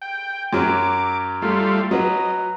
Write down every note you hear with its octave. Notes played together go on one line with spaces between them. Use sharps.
G5
F#2 F#3 D6
G3 A3 F4
F#3 B4 D#5